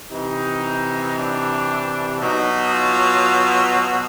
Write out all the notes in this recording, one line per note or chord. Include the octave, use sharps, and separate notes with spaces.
C3 E3 D#4
D4
B2 F#3 D#4
F4